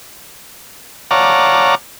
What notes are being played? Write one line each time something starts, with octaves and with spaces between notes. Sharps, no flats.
C#5 D5 F5 F#5 A5 A#5